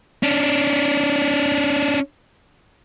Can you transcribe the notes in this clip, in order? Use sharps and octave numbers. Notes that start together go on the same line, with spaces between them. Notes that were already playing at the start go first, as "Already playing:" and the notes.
C#4 D4